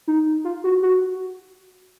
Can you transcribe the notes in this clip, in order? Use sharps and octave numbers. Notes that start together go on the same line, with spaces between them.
D#4
F4
F#4
F#4